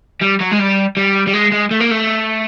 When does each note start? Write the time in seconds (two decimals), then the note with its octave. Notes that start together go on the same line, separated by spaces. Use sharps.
0.22 G3
0.41 F#3
0.52 G#3
0.59 G3
0.97 G3
1.27 G3
1.34 G#3
1.52 G#3
1.71 A3
1.80 A#3
1.91 A3